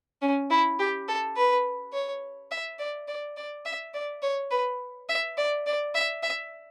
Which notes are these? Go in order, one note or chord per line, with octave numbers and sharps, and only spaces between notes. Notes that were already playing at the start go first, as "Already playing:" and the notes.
C#4
E4
G4
A4
B4
C#5
E5
D5
D5
D5
E5
D5
C#5
B4
E5
D5
D5
E5
E5